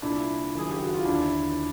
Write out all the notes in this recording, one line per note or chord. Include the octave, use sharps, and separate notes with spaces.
C2 A#2 D4 E4
F#1 F#2 D#3 G#4
G4
F#4
F4
D#2 D3 D4 E4